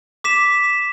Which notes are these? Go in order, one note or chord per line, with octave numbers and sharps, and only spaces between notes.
D6 B6 E7